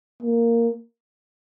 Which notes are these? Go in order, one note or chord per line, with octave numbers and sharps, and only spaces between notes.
A#3